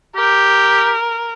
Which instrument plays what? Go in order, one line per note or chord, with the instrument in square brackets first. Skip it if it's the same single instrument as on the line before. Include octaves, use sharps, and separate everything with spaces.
[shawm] G4 [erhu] A#4